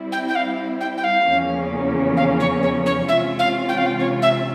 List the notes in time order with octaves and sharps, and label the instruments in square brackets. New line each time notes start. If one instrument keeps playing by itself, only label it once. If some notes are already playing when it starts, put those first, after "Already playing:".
Already playing: [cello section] G3 C4 E4
[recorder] G5
G5
F5
G5
G5
F5
[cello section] E2 C#3 F3 A#3 C#4
[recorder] F5
C#5
C#5
C#5
[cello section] C3 E3 G#3 C#4 F4 [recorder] E5
[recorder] F5
G5
F5
G5
C#5
E5